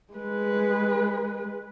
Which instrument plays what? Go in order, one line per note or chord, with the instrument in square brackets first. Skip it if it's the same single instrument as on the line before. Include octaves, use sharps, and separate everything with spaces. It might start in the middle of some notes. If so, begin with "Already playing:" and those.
[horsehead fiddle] G#3 B4